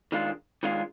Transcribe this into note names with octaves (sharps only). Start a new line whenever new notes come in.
D#3 G#3 D4 F4
D#3 G#3 D4 F4